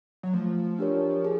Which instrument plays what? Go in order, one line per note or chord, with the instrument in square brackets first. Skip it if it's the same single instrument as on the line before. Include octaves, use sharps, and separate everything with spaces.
[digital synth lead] F#3
[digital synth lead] F3 [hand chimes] A3
[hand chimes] D4 G4 A#4 C#5
G#4